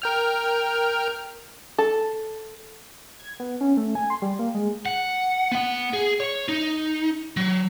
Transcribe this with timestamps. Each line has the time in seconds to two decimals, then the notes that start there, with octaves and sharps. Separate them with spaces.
0.02 A#4 G5 F6
1.78 A4
3.19 G#6
3.40 B3
3.61 C#4
3.77 A3
3.95 G#5
4.10 C6
4.22 G3
4.39 A#3
4.54 G#3
4.86 F#5
5.52 B3 F#5
5.93 G#4
6.20 C#5
6.48 D#4
7.37 F#3